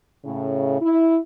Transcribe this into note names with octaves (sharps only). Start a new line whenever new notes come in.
A2 C#3
E4